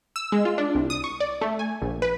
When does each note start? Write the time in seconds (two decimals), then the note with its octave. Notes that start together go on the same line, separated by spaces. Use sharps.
0.16 E6
0.32 G#3
0.45 F4
0.58 D4
0.75 C2
0.90 D#6
1.04 C#6
1.20 D5
1.41 A3
1.59 G#5
1.82 A#1
2.02 B4